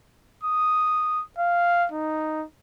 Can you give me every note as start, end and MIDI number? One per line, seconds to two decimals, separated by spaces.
0.43 1.22 87
1.38 1.86 77
1.92 2.44 63